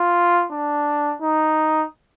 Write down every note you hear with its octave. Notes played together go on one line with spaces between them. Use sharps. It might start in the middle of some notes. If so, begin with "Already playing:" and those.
Already playing: F4
D4
D#4